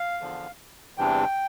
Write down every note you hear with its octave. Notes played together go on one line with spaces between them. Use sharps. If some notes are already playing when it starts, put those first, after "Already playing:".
Already playing: F5
E2 D3 F3
E2 C3 E3 G3 D4 G5